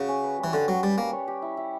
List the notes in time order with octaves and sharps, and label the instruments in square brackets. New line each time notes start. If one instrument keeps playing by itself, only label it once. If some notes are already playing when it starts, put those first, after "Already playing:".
Already playing: [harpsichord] C#3 [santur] F#4
[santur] C#4
B4
G3
[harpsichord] E3
[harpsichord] D3 [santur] F#4
[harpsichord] F#3 [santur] C#4
[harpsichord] G3 [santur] B4
[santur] G3 [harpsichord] A#3
[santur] C#5
G4
E4
E4